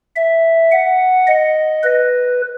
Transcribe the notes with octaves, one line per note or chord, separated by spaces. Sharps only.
E5
F#5
D#5
B4